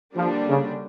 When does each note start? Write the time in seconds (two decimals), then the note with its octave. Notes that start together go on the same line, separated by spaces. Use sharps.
0.15 D3 F3 G3 A#3 D4
0.48 C#3